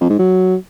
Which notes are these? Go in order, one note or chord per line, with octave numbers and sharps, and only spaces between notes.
F2
G#2
F#3